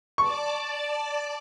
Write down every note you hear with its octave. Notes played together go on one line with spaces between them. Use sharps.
D5 A5 C#6 D6